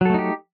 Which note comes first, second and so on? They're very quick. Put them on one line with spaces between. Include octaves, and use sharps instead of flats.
F#3 A4 A3 D#4 G4